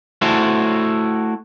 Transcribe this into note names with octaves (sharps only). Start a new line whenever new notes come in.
A3 E4 F#4 C5